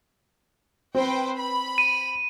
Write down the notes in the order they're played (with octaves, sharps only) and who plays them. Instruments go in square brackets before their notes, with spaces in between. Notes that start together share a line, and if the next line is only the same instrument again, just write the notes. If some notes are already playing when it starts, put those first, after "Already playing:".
[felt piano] C4 [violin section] B4 C5 G5
[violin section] B5
[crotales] D#7